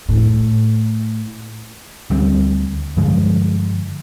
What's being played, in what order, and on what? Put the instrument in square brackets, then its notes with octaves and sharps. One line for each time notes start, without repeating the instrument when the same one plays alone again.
[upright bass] A2
[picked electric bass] D2 G3 B3 C4
G2 D3 F3 G#3